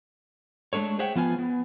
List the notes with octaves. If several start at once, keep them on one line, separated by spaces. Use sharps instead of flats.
G#3 A3 D4 A4 C#5
G#4 C5 C#5 E5 F#5 G5
F3 B3 F4 G#5
B3